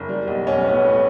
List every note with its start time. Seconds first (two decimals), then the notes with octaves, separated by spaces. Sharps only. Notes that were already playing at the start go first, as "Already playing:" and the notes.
Already playing: F#1
0.09 G3
0.28 B1
0.47 B1 C#4
0.65 A2 B3
0.84 A2